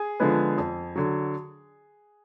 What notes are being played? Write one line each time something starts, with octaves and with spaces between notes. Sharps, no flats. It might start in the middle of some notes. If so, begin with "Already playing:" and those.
Already playing: G#4
D3 F3 G#3 B3
F2
D3 F#3